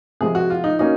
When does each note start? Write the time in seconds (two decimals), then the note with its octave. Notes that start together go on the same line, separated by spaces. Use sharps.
0.21 C3 F3 G#3 G#4
0.35 F#4
0.50 F4
0.64 D#4
0.79 A#3 C#4 D#4 F#4